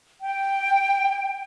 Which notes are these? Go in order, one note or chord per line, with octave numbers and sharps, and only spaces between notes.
G5